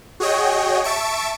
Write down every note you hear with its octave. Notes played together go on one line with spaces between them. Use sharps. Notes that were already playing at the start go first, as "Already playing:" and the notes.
F#4 G#4 C#5 D#5 G5
E5 A5 C#6 D7